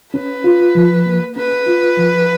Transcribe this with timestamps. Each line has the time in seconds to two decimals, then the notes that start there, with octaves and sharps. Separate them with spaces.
0.14 C#4 B4
0.44 F4
0.75 F3
1.06 A#3
1.36 C#4 B4
1.66 F4
1.97 F3